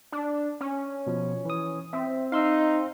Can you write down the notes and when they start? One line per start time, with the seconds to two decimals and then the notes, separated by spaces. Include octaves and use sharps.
0.12 D4
0.61 C#4
1.07 B2 F3
1.45 E3 D#6
1.93 C4 E5
2.32 D#4 F5 C6 E6